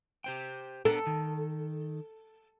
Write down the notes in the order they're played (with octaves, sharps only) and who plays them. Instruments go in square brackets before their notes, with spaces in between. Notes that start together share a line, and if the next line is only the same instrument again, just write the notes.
[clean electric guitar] G4 C5 G5
[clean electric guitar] B3 D4 A#4 [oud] A4
[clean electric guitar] D#3